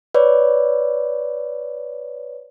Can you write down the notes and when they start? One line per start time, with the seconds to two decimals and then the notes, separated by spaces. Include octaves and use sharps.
0.14 B4 C#5 D5